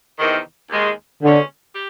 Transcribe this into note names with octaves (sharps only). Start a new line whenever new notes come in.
E2 C3 D#3
D#2 D#3 G#3
B2 D3 G#3 C#4
G4